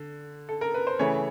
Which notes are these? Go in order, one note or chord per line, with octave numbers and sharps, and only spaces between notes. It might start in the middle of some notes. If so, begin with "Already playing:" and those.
Already playing: D3
A4
A#4
B4
C5
C#3 E3 A3 C#5